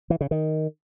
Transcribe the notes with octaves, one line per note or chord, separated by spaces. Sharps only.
E3
C#3
D#3